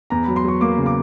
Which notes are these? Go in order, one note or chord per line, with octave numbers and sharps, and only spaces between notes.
E2 A#5
F#3 B5
C6
F#3 C#6
A#3 D6
C#3
D6